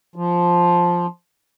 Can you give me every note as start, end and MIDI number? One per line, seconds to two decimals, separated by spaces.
0.16 1.06 53